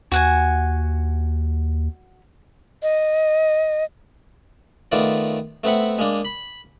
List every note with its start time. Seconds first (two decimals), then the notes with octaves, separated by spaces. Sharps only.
0.12 D#2 F#4 F#5 G#5
2.83 D#5
4.92 D#3 A3 B3 F4 D5
5.64 A3 B3 C4 E5 F#5
5.99 G#3 A#3 D4
6.25 B5